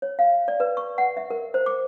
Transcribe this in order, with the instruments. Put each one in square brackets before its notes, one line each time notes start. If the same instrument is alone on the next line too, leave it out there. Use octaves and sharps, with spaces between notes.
[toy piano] C#5
F5
D5
B4
C#6
F#5
E5
A#4
C5
D6